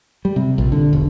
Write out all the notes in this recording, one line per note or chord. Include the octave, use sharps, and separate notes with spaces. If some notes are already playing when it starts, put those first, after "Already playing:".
G3
C3
A#1
D3
E1